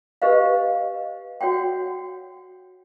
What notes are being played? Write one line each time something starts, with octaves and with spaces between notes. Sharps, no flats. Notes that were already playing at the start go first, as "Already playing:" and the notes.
G4 B4 C5 D#5 F5
F#4 C#5 F#5 G5